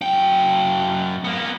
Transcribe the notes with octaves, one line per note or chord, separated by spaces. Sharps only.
F#2 G5
A#3 B3